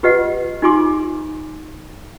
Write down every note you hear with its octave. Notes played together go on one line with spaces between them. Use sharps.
F4 G4 B4 D#5 F#5
D#4 F4 G4 G#5 C6 D6